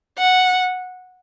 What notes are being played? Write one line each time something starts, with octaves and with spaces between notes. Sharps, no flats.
F#5